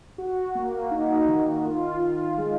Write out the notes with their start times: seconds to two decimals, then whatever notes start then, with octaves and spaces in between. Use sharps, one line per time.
0.18 F#4
0.55 A#3
0.91 D#4
1.29 D#3
1.65 F4
2.01 F4
2.38 G#3